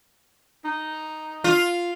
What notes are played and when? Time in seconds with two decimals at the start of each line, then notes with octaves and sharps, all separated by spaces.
0.65 D#4
1.44 F4